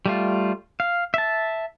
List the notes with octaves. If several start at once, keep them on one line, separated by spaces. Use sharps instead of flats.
G3 A3 F4
F5
E5 A5